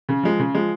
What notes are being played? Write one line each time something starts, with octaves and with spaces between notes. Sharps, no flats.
C#3
F3 G#3
C#3
F3 G#3